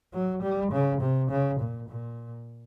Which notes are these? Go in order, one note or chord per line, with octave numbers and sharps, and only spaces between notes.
F#3
G3
C#3
C3
C#3
A#2
A#2